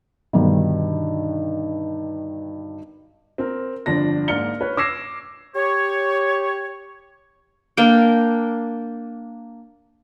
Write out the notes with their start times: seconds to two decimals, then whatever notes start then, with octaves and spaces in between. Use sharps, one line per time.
0.33 G2 B2 D3 D#3
3.38 C4 A#4
3.86 G1 F2 D4 A#6
4.28 G#2 A#3 D5 F6 C#7 G7
4.61 B4 C#5
4.77 D6 E6 G#6 A#6 C7 E7
5.56 G4 C#5
7.77 A#3 D4 G5